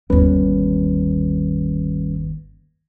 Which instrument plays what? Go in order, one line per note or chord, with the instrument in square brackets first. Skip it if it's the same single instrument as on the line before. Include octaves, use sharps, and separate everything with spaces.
[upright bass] G1 D#2 [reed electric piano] G3 C#4 B4